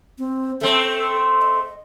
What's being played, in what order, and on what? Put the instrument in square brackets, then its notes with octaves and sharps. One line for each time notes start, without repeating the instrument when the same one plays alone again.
[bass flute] C4
[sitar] A3 C4 [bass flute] A4
[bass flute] D#5